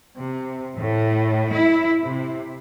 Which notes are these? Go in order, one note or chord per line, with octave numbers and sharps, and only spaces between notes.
C3
A2
E4
C3